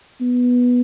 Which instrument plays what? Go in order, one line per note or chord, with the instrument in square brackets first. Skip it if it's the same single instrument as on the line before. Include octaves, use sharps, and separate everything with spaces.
[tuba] B3